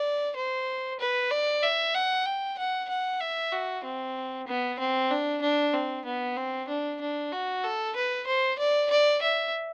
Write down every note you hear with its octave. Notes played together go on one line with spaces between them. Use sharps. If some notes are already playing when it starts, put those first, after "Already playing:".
Already playing: D5
C5
B4
D5
E5
F#5
G5
F#5
F#5
E5
F#4
C4
B3
C4
D4
D4
C4
B3
C4
D4
D4
F#4
A4
B4
C5
D5
D5
E5